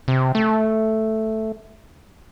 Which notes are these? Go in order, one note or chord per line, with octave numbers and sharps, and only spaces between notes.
C3
A3